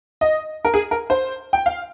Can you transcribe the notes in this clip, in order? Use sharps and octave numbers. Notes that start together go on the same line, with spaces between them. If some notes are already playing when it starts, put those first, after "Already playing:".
D#5
A#4
G#4
A#4
C5
G5
F5